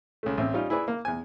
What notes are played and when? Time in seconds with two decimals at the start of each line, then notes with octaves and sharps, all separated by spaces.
0.23 C#2 A3
0.38 A1 C4
0.54 G3 C#4 D#4 F4
0.70 E4 G#4 B4 D5
0.88 A#3
1.05 E2 G#5